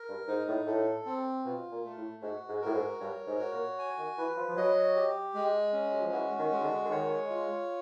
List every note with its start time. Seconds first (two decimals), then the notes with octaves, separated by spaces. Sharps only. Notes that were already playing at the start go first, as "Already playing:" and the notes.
Already playing: A#4
0.09 G2
0.28 G#2 D#4
0.48 A2
0.67 A2 A4
1.06 C4
1.45 B2 F4
1.71 A#2
1.84 A3
1.97 A2
2.22 G#2 F#4
2.49 G#2
2.62 A2 A#4
2.74 G#2
3.00 G2 C#5
3.27 G#2
3.39 F#4
3.53 A#2
3.79 G#5
3.98 D#3
4.18 E3 B4
4.37 F3
4.49 F3
4.57 F#3 D#5
4.96 G4
5.34 G#3
5.73 C#4
5.92 F#3
6.02 F3
6.12 E3 F#4
6.38 D#3
6.52 G#3
6.61 D#3
6.64 D3
6.85 D3
6.90 D#3 C#5
7.30 F4